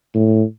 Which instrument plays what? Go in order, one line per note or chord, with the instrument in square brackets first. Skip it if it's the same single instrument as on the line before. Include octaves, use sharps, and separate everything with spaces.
[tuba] A2